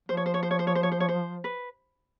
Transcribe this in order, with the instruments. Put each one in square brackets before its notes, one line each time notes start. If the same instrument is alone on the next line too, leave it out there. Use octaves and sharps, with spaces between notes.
[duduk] F3 [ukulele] C5
[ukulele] C#5
C5
C#5
C5
C#5
C5
C#5
C5
C#5
C5
C#5
C5
B4